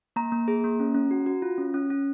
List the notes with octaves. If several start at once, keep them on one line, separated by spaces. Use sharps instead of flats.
A#3 A#5
A#3
G#4
A#3
C#4
C#4
F#4
F#4
F4
C#4
C#4
C#4